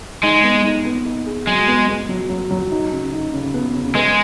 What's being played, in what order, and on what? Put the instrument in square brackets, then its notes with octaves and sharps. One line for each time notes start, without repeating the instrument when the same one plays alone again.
[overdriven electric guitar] G#3 [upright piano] D#4
[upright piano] B3
D#4
B3
D#4
G#4
[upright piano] F#3 [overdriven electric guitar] G#3
[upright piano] B3
B3
F#3
F#3
F#3
D#4
C#3
D#4
C#3
B3
C#3
[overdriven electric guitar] G#3 [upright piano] B4